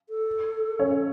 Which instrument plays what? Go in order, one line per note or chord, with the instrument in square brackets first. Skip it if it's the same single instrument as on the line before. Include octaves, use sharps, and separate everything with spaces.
[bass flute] A4
[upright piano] C#4 C#5